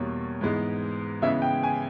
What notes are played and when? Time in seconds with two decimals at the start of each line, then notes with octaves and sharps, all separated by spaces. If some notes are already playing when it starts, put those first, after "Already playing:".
Already playing: E2 B2 G3 A#3 C#5
0.41 G#2 E3 G#3 B3
1.22 C#3 E3 G#3 B3 E5
1.42 G5
1.63 G#5